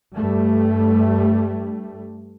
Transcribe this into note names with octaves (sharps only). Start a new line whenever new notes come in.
G2 G3 A3